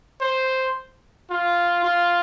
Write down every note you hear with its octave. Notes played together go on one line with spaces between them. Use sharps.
C5
F4
F4